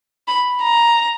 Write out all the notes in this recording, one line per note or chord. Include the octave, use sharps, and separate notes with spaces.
B5
A#5